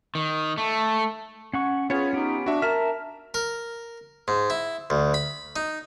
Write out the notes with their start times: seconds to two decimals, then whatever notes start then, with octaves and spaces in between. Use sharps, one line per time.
0.15 D#3
0.58 A3
1.54 C#4 F#5 C#6
1.90 B3 C#4 F4 G#4 C#5 C#7
2.13 B3 D#4 G4
2.46 D4 F#4 E5
2.62 A#4 E5 A5 F6
3.34 A#4
4.28 G#2
4.50 E4
4.90 D2
5.14 B5
5.56 D#4